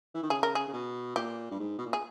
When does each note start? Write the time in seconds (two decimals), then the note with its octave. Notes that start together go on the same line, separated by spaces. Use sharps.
0.14 E3
0.23 D#3
0.30 C#3 G#4
0.43 A#4
0.55 G#4
0.68 C#3
0.73 B2
1.16 A#2 G4
1.51 G2
1.59 G#2
1.78 B2
1.86 A#2
1.93 G#4